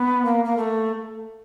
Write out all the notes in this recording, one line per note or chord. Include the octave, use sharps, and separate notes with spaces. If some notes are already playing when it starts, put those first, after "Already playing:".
Already playing: B3
A#3
A#3
A3